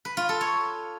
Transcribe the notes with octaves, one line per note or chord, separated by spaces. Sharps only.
B4
F4
A4
C#5